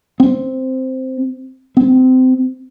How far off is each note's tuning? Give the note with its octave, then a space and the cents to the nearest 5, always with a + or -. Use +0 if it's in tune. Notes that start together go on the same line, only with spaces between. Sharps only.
C4 -5
C4 -25